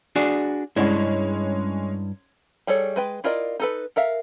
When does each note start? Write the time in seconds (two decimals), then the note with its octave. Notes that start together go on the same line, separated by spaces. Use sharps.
0.16 D4 F#4 G#4
0.76 G2 G#3 C#4 E4 C#5
2.67 G3 G#4 A4 C#5
2.96 G#3 B4 G5
3.24 E4 F4 A#4 D5 D#5
3.60 D#4 A4 B4
3.96 A4 A#4 E5 F5